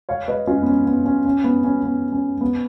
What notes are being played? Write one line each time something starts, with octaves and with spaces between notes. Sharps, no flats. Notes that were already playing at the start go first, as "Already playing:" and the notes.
C#5 F5
B4 D#5
C#4 F4
B3
C#4
B3
C#4
C#4
B3
C#4
B3
C#4
B3